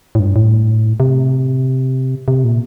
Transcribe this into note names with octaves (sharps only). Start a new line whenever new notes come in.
A2
G2
A2
C3
C3
A#2